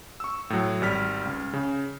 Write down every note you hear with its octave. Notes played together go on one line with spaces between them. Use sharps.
C#6 E6
A2 F#3
G#1 G3 F6 B6
C#2
C#3